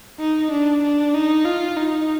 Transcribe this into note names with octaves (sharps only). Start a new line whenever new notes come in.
D#4
D4
D4
D#4
F4
D#4